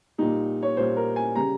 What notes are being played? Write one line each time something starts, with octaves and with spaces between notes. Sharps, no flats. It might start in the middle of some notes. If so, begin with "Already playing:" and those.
A#2 G3 D#4
C#5
A#2 G3 C5
A#4
G#5
C#3 G3 A#5